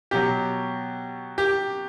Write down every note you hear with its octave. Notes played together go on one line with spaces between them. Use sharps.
B2 F#3 G4
G4